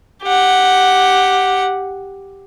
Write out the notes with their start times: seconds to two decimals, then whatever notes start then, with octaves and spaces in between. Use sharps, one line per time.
0.23 G4 F#5